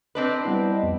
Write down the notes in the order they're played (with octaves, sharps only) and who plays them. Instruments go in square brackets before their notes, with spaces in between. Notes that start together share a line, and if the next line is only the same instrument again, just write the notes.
[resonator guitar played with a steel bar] C4 D4 B4 [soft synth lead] D#5
[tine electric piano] G3 B3 E4
F2